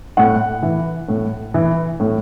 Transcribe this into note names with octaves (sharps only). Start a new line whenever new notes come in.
A2 F#5
E3
A2
E3
A2